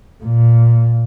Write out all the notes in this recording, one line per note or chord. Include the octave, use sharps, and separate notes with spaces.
A#2